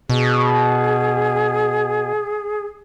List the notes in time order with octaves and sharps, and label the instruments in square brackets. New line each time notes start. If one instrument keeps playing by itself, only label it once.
[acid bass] B2 [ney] G#4